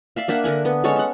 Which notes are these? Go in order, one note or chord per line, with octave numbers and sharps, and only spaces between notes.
D5 E5 F5
A#3 D4 E5 F#5
D3 A#4 F#5 G#5
B3
G#3 C#4 A4 C#5
A4 F#5